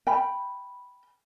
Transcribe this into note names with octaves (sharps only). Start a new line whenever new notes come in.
G5 B5